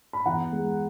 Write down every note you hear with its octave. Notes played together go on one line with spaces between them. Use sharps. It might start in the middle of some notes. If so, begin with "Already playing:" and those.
B5
E2 F#5 A#5
G#3